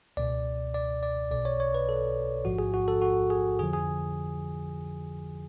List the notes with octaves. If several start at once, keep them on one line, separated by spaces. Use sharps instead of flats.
C#2 B2 D5
D5
D5
B1 B2 D5
C#5
C#5
B4
A4
A1 G#2 F3 F#4
G#4
F#4
A4
F#4
G#4
F2 D3 F3 G#4
G#4